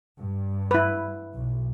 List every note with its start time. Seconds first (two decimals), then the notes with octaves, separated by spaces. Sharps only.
0.19 G2
0.71 E4 B4
1.35 B1